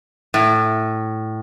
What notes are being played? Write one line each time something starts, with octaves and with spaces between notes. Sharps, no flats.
A2